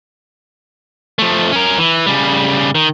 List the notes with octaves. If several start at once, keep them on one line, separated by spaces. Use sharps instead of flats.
F3 A3
C#4 A#4
E3
C#3 G3
D#3